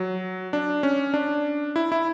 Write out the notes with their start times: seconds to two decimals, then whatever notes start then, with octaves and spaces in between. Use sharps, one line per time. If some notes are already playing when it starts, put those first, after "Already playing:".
Already playing: F#3
0.53 D4
0.83 C#4
1.14 D4
1.76 E4
1.92 E4